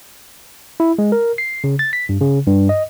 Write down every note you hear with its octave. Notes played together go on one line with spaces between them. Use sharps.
E4
G#3
A#4
C7
C#3
A6
B6
G2
C#3
G2
D#5